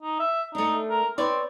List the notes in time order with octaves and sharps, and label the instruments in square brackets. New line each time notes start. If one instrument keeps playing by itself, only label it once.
[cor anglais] D#4
E5
[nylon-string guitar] A3 D4 [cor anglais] D#4
[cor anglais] A#4
[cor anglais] C4 [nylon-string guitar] B4 C#5 D5